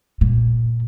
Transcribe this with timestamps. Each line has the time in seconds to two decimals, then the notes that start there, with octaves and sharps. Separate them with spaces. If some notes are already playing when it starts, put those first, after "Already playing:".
0.21 A#2